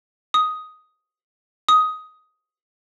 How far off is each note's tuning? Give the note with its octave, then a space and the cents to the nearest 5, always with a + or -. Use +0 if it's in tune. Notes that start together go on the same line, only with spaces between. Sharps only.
D#6 +5
D#6 +10